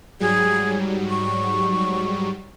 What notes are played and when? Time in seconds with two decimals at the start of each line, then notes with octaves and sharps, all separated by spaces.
0.20 G#2 F#3 G3 G#4
1.10 C#6